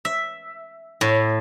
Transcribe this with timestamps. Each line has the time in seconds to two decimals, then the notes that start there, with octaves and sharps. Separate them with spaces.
0.05 E5
1.01 A2